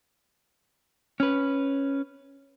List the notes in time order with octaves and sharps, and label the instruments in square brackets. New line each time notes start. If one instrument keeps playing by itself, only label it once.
[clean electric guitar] C#4 B4